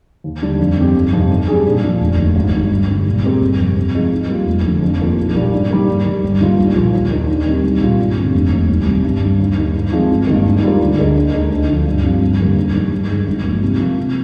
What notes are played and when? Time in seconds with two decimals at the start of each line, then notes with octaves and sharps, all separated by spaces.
0.24 D#2
0.42 D3 G3 D4
0.59 F2
0.78 D#3 G3 C4 G4
0.95 G1
1.13 F2 C3 D#3
1.30 G#2
1.48 G3 D4 G#4
1.65 A#2
1.83 F3 A#3 D4
2.01 F1
2.18 D#2 D#3
2.36 G#1
2.53 G2 D#3
2.71 G1
2.88 G2 D3 G3
3.06 A#2
3.24 G#3 C4 G4 A#4
3.41 G1
3.58 F2 C3
3.77 C3
3.95 F3 G#3 D#4
4.12 G#2
4.30 G3 A#3 F4
4.46 F1
4.64 F2 D3
4.83 F2
5.00 D#3 A#3 F4
5.18 A#1
5.35 A#2 G3 D4
5.52 G#2
5.71 D#3 G3 A#3
5.88 G#2
6.05 D#3 G3
6.23 G1
6.40 G2 D#3 A#3 F4
6.58 C2
6.76 A#2 F3 A#3 F4
6.93 D#2
7.11 D#3 A#3 D4
7.28 D#2
7.46 D#3 G3 C4 G4
7.64 C2
7.81 A#2 G3 A#3 F4
7.99 G2
8.17 D3 G3 C4
8.34 F1
8.51 D#2 D#3
8.69 C2
8.87 C3 G3
9.05 G2
9.22 D#3 G3
9.39 D#2
9.57 D#3 G3 A#3
9.75 G#2
9.92 F3 G#3 C4
10.11 G#1
10.27 G2 D#3 A#3
10.45 G#2
10.63 G3 D4 F4 A#4
10.81 D2
10.97 D3 G#3 D#4 A#4
11.16 D#2
11.34 D3 G#3 D#4
11.51 D2
11.69 D3 F3
11.86 G2
12.04 F3 C4 G4
12.21 G1
12.39 F2 D3 G3 A#3
12.56 G#2
12.74 D#3 G3
12.92 G2
13.09 D#3 G#3
13.27 G#1
13.45 G2 F3 A#3
13.62 C3
13.79 F3 A#3
13.98 C3